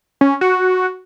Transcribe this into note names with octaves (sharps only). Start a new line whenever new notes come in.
C#4
F#4